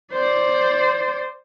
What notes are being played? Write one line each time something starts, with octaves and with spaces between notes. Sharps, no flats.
C5 D5